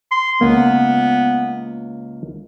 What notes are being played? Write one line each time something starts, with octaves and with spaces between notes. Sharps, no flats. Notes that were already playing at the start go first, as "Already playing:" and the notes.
C6
C#2 A#3 B3